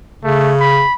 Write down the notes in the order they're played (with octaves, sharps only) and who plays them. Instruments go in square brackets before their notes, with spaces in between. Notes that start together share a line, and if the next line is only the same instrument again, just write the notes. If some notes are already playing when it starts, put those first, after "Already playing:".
[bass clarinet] C#3 [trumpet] A3
[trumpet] B5